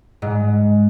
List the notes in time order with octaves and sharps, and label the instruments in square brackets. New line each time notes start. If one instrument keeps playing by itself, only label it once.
[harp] G#2